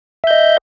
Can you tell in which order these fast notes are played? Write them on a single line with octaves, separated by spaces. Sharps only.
E5 G6 D#5